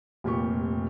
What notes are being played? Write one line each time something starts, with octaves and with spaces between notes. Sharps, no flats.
F1 A#2 G4 C#6